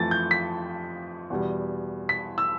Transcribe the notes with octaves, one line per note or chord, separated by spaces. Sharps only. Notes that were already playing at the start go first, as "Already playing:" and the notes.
Already playing: F2 E3 A3 A6
G6
B6
E2 B2 G3
B6
E6